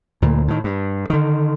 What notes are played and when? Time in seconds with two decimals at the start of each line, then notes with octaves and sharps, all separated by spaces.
0.22 D2 A#2
0.48 A2 D#3
0.64 G2
1.10 D3 D#3